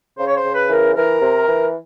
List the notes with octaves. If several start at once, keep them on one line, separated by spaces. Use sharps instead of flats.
C#3 C5
C#5
C5
C#3
B4
E3 A#4
E3 A#4
C3
E3